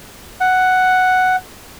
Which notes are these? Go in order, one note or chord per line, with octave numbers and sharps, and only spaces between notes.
F#5